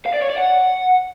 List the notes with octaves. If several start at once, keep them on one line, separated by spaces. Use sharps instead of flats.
F5
D5
C#5
D5
F#5